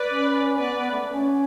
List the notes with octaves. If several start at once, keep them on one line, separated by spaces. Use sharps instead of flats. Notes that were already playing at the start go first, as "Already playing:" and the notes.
Already playing: B4 D5
C#4
B3 B4 D5
B3
A3
A3
C#4